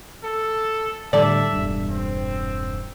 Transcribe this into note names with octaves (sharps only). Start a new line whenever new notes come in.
A4
A2 D3 G3 A4 D5 E5
E1 G2
C4